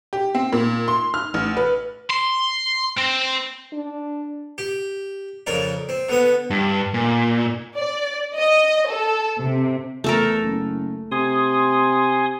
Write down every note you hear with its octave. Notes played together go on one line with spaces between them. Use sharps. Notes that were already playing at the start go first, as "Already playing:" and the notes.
G4
C4
A#2
C6
F6
A1
B4
C6
C4
D4
G4
F2 C#3 A#4 D5
C4
D3 B3 D#6
G2
A#2
D5
D#5
A4
C3
E2 A3 A4 A#4
F#1
C3 G#5 C6 D#6